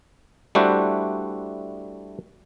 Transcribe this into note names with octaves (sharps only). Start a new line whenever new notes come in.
G3 A3 D4 E4 F#4 C5